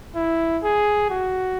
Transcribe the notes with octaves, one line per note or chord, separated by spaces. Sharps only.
E4
G#4
F#4